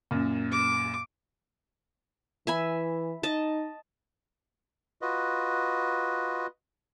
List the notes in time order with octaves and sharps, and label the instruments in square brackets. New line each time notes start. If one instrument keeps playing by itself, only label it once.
[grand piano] F#2 A#2
[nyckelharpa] D6
[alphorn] E3 [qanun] E5 G#5 B5
[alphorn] D#4 [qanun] D#5 A5
[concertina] F4 F#4 B4 D#5